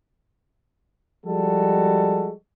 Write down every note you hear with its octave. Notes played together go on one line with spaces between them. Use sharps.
F3 G3 G#3 F#4 A4